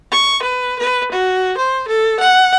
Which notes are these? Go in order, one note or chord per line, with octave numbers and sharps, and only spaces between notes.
C#6
B4
B4
F#4
C5
A4
F#5